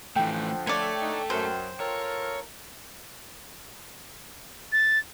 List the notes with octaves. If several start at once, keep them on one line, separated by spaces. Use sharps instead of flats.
D3 E3 F3 A3 G5
A3 A4 C#5 D5
D3 D#4
F#2 C5
F4 A4 A#4 C#5
A6